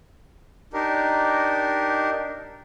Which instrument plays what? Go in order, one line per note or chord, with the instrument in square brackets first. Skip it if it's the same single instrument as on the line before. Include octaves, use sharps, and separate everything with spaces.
[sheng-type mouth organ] D4 D#4 G4 A#4